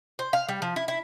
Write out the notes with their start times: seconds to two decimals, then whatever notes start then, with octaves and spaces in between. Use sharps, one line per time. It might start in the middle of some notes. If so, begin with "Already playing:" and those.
0.19 C5
0.33 F5
0.49 G3
0.62 F3
0.76 E4
0.88 E4